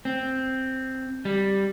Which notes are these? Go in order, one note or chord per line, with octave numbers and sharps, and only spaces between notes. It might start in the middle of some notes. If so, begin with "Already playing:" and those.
C4
G3